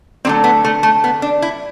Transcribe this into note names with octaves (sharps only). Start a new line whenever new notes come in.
D3 F#3 A3 C4
B3
A3
A3
B3
D4
E4